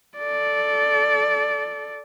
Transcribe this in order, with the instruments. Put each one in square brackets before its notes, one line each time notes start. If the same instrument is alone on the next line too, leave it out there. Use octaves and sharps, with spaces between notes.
[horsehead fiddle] A4 D5